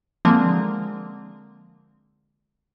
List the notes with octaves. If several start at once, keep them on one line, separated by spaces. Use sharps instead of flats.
D3 F3 G#3 A#3 C4